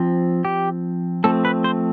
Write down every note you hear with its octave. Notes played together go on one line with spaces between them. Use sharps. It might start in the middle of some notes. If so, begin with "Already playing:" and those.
Already playing: F3 C4
G4
F3 A3 C4 A4
B4
C5